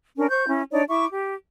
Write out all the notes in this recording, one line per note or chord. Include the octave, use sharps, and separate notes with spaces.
C#4 D4 A#4
C5 C#6 G6
C#4 E4
D4 D#4 C#5 D5
E4 E5 C#6 D6
G4